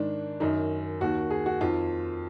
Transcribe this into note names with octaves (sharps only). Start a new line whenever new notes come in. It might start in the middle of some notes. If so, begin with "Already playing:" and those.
Already playing: G#2 D#3 D4
F#2 D#3 D#4
D#2 D#3 F#4
G#4
F#4
F2 D#3 F4